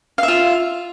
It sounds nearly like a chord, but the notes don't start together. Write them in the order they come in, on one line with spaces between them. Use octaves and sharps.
F5 E5 F4